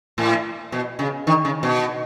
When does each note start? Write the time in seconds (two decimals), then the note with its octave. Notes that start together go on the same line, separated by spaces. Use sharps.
0.18 A2
0.72 B2
0.99 C#3
1.27 D#3
1.45 C#3
1.63 B2